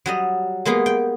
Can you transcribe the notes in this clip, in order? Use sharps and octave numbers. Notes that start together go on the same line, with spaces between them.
F#3 G3 D#5
G#3 A#3 B3 G#4
G5